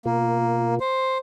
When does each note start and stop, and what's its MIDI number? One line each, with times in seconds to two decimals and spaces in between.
0.05 0.79 47
0.05 0.74 58
0.05 0.79 65
0.05 0.79 70
0.80 1.18 72